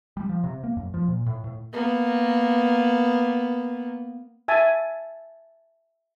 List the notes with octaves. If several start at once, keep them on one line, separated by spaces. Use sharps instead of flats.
G3
F3
C3
A#3
F#2
F3
A#2
A2
A2
A#3 B3
E5 G#5 A5